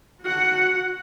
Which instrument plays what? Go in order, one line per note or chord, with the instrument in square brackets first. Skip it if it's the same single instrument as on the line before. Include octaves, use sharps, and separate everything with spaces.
[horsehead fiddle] F#4 F#5